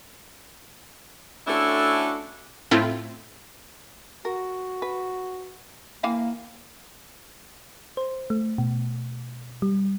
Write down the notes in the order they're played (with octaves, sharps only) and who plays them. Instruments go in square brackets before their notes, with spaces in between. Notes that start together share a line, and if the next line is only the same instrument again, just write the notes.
[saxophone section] A3 C#4 D4 E4 F#4 A4
[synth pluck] A2 A3 C4 E4 F4
[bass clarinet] F#4 [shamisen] A#4
[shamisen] B4
[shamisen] E3 F5 G5 [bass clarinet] A#3
[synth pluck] C5
A3
B2
G3